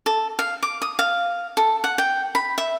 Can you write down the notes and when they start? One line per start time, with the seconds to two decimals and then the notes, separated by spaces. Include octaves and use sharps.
0.06 A4
0.39 F5
0.63 D6
0.82 D#6
0.99 F5
1.57 A4
1.84 F#5
1.98 G5
2.35 B5
2.58 E5